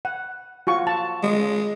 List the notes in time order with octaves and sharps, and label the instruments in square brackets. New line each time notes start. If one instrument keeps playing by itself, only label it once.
[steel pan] F#5
F4 F#4 C#6
A5
[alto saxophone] G#3